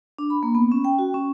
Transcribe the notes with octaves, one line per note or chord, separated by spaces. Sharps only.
D4
B5
A#3
B3
C#4
G5
F#4
C#4